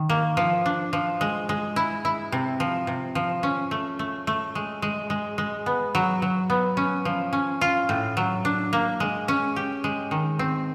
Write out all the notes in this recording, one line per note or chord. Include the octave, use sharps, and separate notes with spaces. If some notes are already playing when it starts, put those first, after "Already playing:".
Already playing: D#3
A#3
F3
D4
F3
G#3
G#3
E4
E4
C3
F3
C3
F3
C#4
A3
A3
A3
G#3
G#3
G#3
G#3
B3
F#3
F#3
B3
C#4
F3
C#4
F4
A2
F#3
D4
A#3
G#3
C#4
G4
G#3
D#3
C4